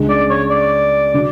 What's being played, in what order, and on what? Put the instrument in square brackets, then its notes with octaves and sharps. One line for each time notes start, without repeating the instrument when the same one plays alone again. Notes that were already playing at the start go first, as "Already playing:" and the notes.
Already playing: [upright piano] C#2 C#3 G#3 D4
[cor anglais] D5
C#5
D5
[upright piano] D3 F#3